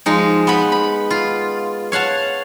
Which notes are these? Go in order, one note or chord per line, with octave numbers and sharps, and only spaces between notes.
F3 G#3 D#4
B3 F#5 B5
B5
F4
C#5 F5 F#5 A5